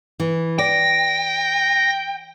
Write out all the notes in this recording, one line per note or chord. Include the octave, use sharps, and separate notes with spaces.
E3
D5 G5 A#6